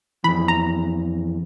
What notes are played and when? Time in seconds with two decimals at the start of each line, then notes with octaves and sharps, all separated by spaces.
0.24 F2 E3 B5
0.48 A#5